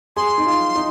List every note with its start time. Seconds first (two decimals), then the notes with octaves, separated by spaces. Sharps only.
0.16 G#4 C6
0.38 D#4
0.46 F4
0.75 D#4